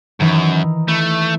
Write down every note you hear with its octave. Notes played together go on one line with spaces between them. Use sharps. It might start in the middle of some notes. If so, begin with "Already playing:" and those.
F#2 D#3 E3 D#4
A3 E4